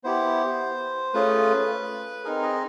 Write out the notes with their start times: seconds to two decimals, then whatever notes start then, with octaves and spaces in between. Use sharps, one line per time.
0.04 B3 E4 G4 C5
1.14 A3 C#4 F4 G#4 B4
2.24 C4 D#4 G#4 A#4
2.43 D#5